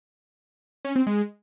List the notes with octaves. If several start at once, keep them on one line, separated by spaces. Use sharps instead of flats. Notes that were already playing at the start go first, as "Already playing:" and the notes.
C#4
C4
G#3